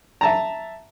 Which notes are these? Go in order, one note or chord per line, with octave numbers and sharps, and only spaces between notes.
E5 A5 A#5